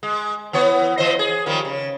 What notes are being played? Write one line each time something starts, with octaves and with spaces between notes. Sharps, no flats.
G#3
E3 B3 C#5
E3 C5 D#5
G#4
D#3 F3 G3
C#3